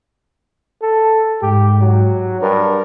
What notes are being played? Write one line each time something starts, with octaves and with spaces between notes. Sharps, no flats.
A4
G#2 G4
F#3
G2 A#4